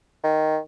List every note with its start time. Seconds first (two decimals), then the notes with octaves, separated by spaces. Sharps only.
0.24 D#3